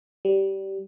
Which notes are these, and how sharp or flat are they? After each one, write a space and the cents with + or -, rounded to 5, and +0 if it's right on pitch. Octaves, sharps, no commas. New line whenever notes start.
G3 -15